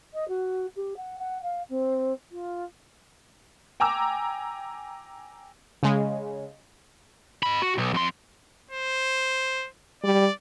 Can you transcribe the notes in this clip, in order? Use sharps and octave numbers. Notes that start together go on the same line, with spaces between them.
D#5
F#4
G4
F#5
F#5
F5
C4
F4
G5 G#5 A#5 D6 E6
C#3 G#3
D#5 B5
F#4
B1
F2 C6
C5
G3 D5